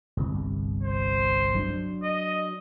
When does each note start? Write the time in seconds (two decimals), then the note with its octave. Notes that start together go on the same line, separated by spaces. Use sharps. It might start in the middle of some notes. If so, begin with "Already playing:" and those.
0.17 G1 C2
0.83 C5
1.54 F#3 D4
2.03 D#5